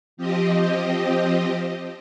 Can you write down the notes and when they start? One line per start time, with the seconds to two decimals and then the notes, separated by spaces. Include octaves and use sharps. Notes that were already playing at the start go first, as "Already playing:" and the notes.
0.17 F3 C4 G4 D#5